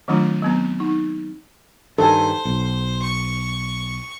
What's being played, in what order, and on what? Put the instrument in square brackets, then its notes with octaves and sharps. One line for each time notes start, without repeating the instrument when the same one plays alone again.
[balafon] D#3 F#3 A3 C4 D4 F4
F#3 B3 C4
D#4
[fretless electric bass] G2 D#3 [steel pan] A4 G#5 [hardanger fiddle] C5
[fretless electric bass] B1
[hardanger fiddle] C#6